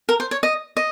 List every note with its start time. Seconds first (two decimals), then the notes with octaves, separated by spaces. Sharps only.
0.09 A#4
0.20 C5
0.31 C#5
0.43 D#5
0.77 D#5